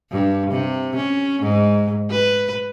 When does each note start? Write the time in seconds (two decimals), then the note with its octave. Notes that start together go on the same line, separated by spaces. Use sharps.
0.11 G2
0.50 C3
0.96 C#4
1.43 G#2
2.11 B4